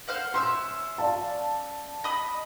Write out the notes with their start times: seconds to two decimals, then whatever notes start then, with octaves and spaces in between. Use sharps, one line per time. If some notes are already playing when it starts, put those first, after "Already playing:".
0.07 C5 F5 F#5
0.34 C#4 E5 C6 E6
0.98 D5 F5 A5
2.04 D#5 B5 D#6